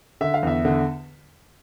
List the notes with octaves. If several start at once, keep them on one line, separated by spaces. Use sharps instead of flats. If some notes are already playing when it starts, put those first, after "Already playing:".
D3 E5
F5
E2 E5
D3